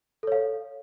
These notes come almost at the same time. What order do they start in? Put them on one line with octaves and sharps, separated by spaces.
A4 C#5 F5